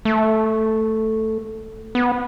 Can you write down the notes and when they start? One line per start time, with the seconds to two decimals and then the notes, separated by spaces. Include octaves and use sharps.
0.05 A3
1.95 B3